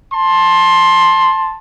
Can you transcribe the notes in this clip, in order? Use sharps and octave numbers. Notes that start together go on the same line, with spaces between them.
A5 C6